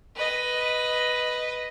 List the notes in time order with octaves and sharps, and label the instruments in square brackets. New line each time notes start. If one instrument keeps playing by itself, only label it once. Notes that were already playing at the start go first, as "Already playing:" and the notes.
[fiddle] B4 D#5